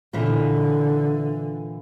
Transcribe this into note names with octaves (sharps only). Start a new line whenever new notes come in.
A#2 D3 E3